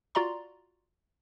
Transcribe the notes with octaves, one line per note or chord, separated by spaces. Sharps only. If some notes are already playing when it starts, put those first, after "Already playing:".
F4 F#4 D5 A#5 C6